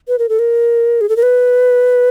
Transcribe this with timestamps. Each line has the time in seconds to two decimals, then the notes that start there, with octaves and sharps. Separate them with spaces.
0.08 B4
0.19 A#4
0.29 A4
0.39 A#4
1.01 G#4
1.09 A4
1.16 A#4
1.23 B4